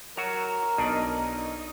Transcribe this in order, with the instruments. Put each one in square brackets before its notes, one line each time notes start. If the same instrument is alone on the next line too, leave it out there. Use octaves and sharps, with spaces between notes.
[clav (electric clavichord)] F#3 F#4 [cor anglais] A#4 [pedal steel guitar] A#5
[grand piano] B1 [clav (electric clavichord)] D4 [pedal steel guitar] D#4 D#5